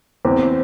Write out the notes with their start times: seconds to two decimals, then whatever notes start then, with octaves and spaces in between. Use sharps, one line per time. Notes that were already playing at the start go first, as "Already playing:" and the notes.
0.25 E2 C4